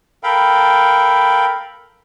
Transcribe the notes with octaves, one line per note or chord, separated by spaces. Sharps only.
A4 A#4 F5 G5 B5